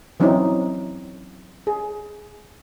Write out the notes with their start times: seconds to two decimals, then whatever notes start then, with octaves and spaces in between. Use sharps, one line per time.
0.20 E3 F#3 C4 C#4 D#4 E4
1.67 G#4